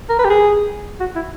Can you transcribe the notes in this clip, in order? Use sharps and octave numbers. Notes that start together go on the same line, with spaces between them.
A#4
B4
G4
G#4
F#4
E4